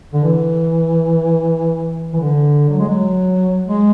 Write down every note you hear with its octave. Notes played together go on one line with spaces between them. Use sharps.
D3
E3
E3
D3
F#3
G#3
F#3
G#3